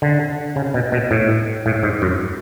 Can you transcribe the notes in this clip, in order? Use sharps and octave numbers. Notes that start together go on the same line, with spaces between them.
D3
C#3
B2
B2
A2
A2
G#2
F#2